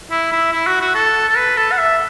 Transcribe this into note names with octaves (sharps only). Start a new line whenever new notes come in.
E4
E4
E4
F#4
F#4
A4
A4
B4
A4
F#5
E5